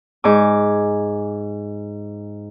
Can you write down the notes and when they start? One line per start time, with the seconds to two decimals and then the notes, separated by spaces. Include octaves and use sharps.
0.24 G#2 G#5 D6